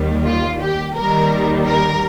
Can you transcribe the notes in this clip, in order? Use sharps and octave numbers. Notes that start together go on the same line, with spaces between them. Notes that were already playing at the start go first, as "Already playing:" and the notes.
Already playing: D#2 D#3 G3
F4
G4
D#2 D#3 G3 A#4
A#4